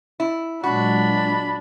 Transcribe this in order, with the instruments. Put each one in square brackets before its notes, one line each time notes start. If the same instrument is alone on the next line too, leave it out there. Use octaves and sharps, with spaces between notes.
[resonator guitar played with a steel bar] E4
[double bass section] A#2 F#3 G#3 [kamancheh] D4 [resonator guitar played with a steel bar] F#4 [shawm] B5